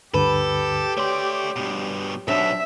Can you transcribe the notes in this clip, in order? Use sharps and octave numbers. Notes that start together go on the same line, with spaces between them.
D2 G2 D3 G4 A4 B4
A3 C#5 D5 C6
G2 B2
B1 B2 C4 D4 C#5 E5